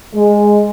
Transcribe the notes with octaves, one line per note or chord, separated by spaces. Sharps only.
G#3